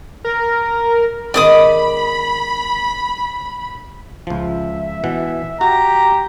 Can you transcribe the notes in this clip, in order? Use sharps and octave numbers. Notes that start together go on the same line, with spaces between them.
A#4
G#2 B2 D#3 D5 B5 D6 D#6
C#2 F3 E5
B2 E3 F#5
F#4 G4 A#5